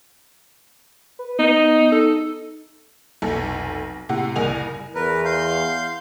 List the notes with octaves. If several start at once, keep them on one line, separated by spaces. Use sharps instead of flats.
B4
B3 D#4
D#4 A4
F1 B1 A4 G#5
A2 C3 F#5
F#1 C2 G#4 A#4 G#5 F7
E2 A#4 B4
F5 C6 G6